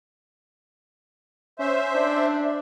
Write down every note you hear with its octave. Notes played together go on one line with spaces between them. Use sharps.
C#4 C5 E5
D4